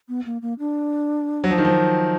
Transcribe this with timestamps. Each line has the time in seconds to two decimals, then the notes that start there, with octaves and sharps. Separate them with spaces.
0.09 B3
0.26 A#3
0.42 A#3
0.59 D4
1.44 F#3
1.51 F3
1.58 D#3
1.65 F3